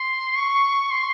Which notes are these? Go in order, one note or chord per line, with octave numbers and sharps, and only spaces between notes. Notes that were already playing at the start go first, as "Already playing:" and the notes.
Already playing: C6
C#6
C6